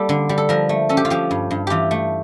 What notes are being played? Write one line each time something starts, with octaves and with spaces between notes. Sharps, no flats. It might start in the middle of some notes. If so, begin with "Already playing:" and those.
Already playing: G3 A#3 A4
D3
G3
A4
F3 A#4
A3
C#4 A4
G4
F4
F3 G4
G2
G2
E3 F4 G4
A3